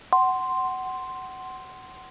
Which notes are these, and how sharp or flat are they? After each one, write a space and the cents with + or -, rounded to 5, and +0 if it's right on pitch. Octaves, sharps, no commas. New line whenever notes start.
F#5 +20 C6 +0